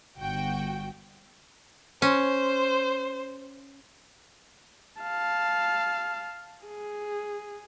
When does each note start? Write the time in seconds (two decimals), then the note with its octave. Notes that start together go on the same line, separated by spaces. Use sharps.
0.17 G1 F#4 G5
2.02 C#4 C5
5.01 F5 A5
6.65 G#4